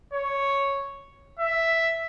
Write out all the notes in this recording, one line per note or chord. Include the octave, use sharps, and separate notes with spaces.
C#5
E5